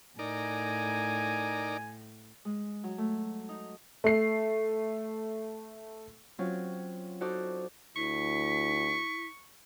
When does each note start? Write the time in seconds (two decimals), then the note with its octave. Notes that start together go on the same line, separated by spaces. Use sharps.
0.19 A2 D#4 A#4 D5 G#5
2.45 G#3
2.84 F#3
2.98 A3
3.49 D#4
4.04 A3 C7
6.39 F#3 C4 C#4 F4
7.21 D#4 F#4 A4 C5 D5
7.96 D2 E4 C#6 B6